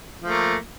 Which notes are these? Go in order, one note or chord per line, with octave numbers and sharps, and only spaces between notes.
F3 A3 A#3